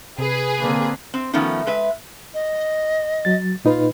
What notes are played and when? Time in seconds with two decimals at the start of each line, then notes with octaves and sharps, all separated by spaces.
0.19 C3 G#4 B4
0.60 D3 A#3 C4
1.14 C4
1.33 D#3 F3 A3 B3 C#4 D#4
1.67 G#3 B4 E5
2.34 D#5
3.25 F#3 A6
3.65 A#2 D#4 F4 B4